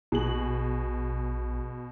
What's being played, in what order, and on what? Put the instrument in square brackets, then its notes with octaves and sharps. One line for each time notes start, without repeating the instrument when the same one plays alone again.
[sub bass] A#1 [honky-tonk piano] B2 G#4 F#7